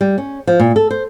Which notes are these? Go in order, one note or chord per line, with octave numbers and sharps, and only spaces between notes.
G3
C#4
F3
A#2
A4
C5